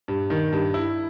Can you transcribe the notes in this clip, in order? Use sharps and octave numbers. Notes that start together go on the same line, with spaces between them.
G2
D#3
G2
E4